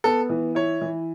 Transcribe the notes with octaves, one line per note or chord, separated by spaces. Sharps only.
B3 A4
E3
E4 C#5
E3